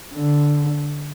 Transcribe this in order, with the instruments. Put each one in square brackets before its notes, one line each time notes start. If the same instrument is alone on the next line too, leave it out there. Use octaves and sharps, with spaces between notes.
[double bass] D3